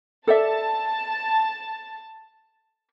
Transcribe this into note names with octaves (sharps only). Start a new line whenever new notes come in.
A4 D5 E5 A5